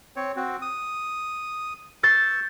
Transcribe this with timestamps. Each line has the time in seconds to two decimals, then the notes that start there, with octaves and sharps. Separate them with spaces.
0.16 C4 C#5
0.36 C4 F#4
0.62 D#6
2.03 C#6 E6 G6 A6 C7